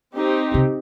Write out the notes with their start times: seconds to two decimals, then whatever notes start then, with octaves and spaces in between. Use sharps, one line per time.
0.16 C4 D#4 G4
0.54 C3